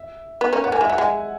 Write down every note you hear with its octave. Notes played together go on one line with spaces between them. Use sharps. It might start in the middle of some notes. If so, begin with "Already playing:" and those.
Already playing: E5
B3
A#3 C#4
B3 F#5
A#3 G#5
G#3 E5
F#3 F#5
G#3 G#5